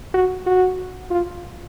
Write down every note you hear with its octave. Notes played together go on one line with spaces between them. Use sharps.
F#4
F#4
F4